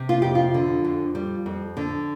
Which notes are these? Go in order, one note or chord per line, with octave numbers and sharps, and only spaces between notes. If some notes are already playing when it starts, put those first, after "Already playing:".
Already playing: C3
F4
F2 G4
F4
D3
F2
G3
F2
D3